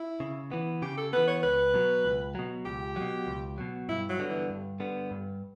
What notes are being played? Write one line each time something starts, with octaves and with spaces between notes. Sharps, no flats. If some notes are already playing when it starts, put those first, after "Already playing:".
Already playing: E4
C#3
E3 B3
C#3 G4
A4
E3 B3 B4
C#5
C#2 B4
B2 F#3
C#2
B2 F#3
C#2 G4
B2 F#3
C#2
B2 F#3
G2 E4
F#3
D3 G3 B3
E3
G2
D3 G3 B3
G2